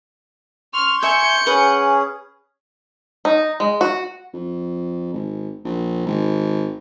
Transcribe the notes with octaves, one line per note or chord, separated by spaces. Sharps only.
C6 C#6 F6
E5 G#5 G6 C#7
C#4 G#4 B4 F#5
D#4
G#3
F#4
F2
G#1
A#1
G#1